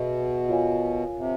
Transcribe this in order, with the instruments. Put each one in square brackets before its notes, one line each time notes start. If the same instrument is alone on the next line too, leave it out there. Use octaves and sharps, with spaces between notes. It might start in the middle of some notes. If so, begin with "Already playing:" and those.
Already playing: [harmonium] B2 [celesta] G#4 E5
[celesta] F4 A#4 C#5 F5 G#5
[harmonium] C3